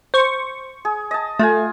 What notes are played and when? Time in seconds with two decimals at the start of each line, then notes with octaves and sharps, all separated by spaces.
0.14 C5 C#6
0.85 G#4
1.11 D#5 A5
1.39 A3 F4 G#5